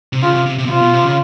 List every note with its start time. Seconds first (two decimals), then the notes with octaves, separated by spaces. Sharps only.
0.13 C3
0.22 C#3 F4
0.34 C3
0.46 C3
0.58 C3
0.65 B2
0.70 C3 F4
0.81 B2
0.93 C3
1.05 C#3